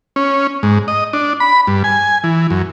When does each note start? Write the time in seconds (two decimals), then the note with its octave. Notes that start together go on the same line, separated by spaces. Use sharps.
0.16 C#4
0.63 G#2
0.88 D#5
1.13 D4
1.40 B5
1.67 G2
1.84 G#5
2.24 E3
2.50 F#2